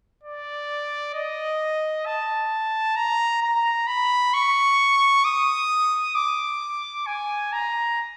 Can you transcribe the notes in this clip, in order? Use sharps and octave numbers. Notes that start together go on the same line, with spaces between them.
D5
D#5
A5
A#5
A#5
B5
C#6
D#6
D6
G#5
A#5